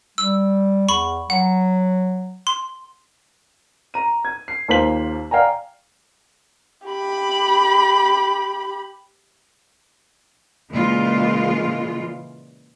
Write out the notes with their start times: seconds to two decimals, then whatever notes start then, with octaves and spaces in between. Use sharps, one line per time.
0.18 G3 E6
0.89 E2 B5 C#6
1.30 F#3 F#5
2.47 C6
3.94 A#5 D#7
4.25 G#6
4.48 C7
4.68 D#2 A#3 F4 C5 B6 F#7
5.31 D5 F5 G5 G#5 A#5
6.87 G4 B5
10.70 A#2 C#3 E3 G#3 F4